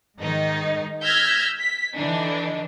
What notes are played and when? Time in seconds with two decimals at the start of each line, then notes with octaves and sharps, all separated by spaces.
0.18 G#2 D#3 D#4
1.04 E6 F6 G6 G#6 A#6 B6
1.59 B6
1.94 D3 E3 D4 D#4